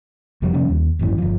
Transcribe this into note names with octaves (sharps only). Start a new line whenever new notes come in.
F1 F3 G3
C3 F3 G3 C#4
D#2
G#1 F#2 E3
G1 F3